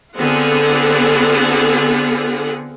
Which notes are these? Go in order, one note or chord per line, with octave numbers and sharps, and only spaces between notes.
D3 B3 C4 F4 G#4 F#5